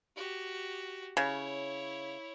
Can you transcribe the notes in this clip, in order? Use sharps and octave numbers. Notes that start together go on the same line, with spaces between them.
F#4 G4
C#3 E4 C#5